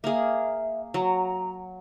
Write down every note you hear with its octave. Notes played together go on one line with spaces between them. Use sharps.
A#3 G#4 E5
F#3 A#5